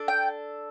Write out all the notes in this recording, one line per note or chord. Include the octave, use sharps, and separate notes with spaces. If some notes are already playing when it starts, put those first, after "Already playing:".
Already playing: D4 A4
G5